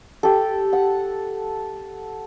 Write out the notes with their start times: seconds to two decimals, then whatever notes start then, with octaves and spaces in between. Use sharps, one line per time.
0.23 G4 A4
0.73 F#5